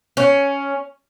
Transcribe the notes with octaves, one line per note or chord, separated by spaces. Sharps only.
C#4